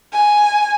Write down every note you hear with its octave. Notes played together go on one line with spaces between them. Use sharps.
G#5